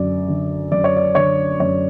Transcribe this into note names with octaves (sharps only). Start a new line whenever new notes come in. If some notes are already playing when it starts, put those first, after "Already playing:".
Already playing: F#2 D3 D5
D3
F#2 D5
C#5
D5
D3 C#5
F#2 C#5